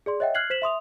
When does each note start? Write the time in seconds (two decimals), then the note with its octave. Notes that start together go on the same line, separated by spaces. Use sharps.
0.06 G#4 D5 C6
0.20 C#5 D#5 E5 F#5 G5
0.35 F6 F#6 G#6 C7 F#7
0.50 C5 B6 E7 F#7
0.62 E5 C6 D#6 F7